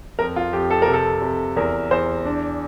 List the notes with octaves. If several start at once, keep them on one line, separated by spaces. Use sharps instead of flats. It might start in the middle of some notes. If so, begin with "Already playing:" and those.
F2 A#4
F4
F2 G4
A4
A#4
C3
A4
C3
E2 A#4
E2 C5
D4